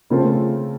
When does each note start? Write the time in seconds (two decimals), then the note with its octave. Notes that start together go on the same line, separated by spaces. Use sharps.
0.10 C#3 F3 A3 C4 F4